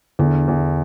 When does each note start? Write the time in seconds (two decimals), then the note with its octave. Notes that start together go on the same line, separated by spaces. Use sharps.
0.19 E2 D3
0.48 E2